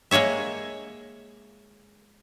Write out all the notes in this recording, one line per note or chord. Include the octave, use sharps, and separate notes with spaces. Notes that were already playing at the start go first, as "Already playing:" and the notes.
G#3 A#3 G#4 C#5 E5